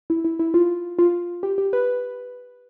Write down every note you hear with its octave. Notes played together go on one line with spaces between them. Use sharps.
E4
E4
E4
F4
F4
G4
G4
B4